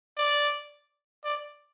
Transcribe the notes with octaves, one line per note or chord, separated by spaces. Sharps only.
D5
D5